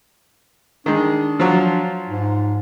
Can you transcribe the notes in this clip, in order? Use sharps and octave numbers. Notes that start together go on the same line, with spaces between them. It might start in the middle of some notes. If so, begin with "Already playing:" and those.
D#3 G#3 D4
F3 F#3
G#2